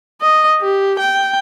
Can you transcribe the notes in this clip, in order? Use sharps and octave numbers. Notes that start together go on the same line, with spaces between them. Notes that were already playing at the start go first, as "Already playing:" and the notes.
D#5
G4
G5